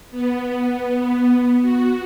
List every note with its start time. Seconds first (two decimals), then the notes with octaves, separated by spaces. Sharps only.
0.11 B3
1.62 F#4